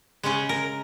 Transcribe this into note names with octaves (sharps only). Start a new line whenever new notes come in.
C#3 G#3 C#4 G#4
A#4